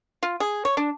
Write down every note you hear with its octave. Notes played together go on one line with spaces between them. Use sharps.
F4
G#4
C#5
D4